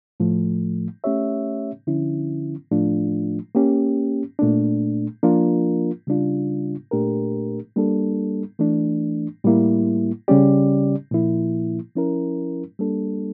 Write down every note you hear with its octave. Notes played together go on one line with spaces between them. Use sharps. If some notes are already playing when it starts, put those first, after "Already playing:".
A2 F3 A3
A3 C#4 G4 C#5 E5
D3 F3 C#4 E4
A2 F3 A3 D4 F4
A#3 C#4 G4
A#2 A3 D4
F3 A#3 D4 F4 A#4
C#3 G3 D4 F4
A#2 A3 D4 G4 A#4
G3 A#3 D4 A4
E3 A3 D4
A2 G3 A#3 E4
C#3 G3 C#4 G4 D5
A#2 F3 A#3 E4
F3 C#4 E4 A#4
G3 A#3 D4 A4